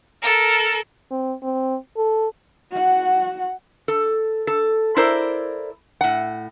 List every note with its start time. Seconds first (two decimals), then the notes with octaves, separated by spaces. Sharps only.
0.23 A4 A#4
1.11 C4
1.42 C4
1.97 A4
2.71 F#4 F#5
3.88 A4
4.47 A4
4.96 E4 A4 A#4 C5 D5
6.01 A2 F#5